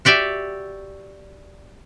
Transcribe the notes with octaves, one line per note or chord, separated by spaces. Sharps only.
F#4 G4 D5 E5